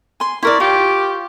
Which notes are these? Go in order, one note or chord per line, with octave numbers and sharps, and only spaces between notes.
G#5 C6
E4 A#4 D5 C6 C#6 F6
F4 G4